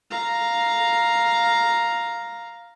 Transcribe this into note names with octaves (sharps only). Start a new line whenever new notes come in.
F5 A#5